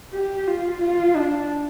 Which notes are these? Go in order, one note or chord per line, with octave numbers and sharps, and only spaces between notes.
G4
F4
F4
D4